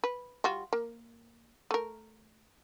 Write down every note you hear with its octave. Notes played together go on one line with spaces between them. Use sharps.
B4
G3 F4 F#4
A#3
A3 A#4